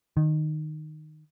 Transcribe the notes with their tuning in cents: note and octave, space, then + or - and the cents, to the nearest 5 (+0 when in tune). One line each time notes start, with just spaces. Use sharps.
D#3 -15